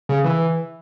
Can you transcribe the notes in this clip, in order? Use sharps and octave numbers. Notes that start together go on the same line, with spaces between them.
C#3
E3